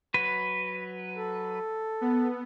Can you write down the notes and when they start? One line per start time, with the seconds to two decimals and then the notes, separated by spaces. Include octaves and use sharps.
0.14 F#3 B4
1.16 A4
2.01 B3